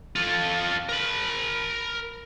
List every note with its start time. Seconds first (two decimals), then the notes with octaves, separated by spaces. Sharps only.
0.15 F4 A4
0.89 A#4 B5